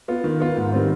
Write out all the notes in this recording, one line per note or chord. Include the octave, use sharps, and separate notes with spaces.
B3 F4
D#3
B3 F4
G#2
D#3 G3 C4 F4